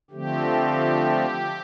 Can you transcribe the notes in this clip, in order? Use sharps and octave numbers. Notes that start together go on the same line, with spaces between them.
D3 F3 A3 C4 G4